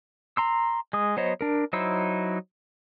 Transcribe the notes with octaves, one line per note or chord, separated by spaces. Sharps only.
A#5 C6 E6
G#3 D#6
F#3 B3 C5 C#5 D#5
D4 A#4
F#3 D#4 E4 C5 E6